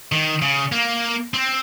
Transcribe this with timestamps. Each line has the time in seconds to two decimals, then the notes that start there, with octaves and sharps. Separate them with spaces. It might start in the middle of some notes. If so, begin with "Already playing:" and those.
0.12 D#3
0.42 C#3
0.72 A#3
1.34 C4